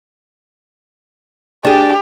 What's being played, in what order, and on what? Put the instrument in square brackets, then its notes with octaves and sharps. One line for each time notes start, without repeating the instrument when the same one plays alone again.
[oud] D4 G#4 [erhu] G4